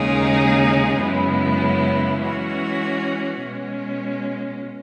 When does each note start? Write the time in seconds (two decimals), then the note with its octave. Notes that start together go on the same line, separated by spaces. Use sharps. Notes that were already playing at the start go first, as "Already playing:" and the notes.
Already playing: D#2 C#3 G#3 D#4 G#4
0.99 F#2 C#3 G#3 B3 E4
2.21 E3 G#3 C#4 F#4
3.42 B2 G#3 C#4